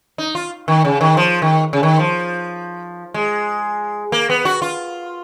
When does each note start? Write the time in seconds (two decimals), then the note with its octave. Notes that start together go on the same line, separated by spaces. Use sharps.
0.18 D#4
0.35 F4
0.68 D#3
0.85 C#3
1.01 D#3
1.17 F3
1.42 D#3
1.73 C#3
1.83 D#3
1.99 F3
3.14 G#3
4.12 A#3
4.30 B3
4.45 F#4
4.62 F4